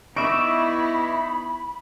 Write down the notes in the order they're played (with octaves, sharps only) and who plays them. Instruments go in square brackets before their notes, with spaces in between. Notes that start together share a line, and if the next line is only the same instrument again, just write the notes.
[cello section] B3 E4 [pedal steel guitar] D#4 D5 E5 [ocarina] B5 [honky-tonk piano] C#6 D7